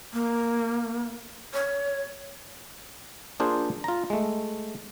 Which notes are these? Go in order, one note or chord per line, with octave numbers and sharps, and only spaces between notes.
A#3
C#5
A#3 D4 F4 G#4 C5
F4 A#5
G#3 A3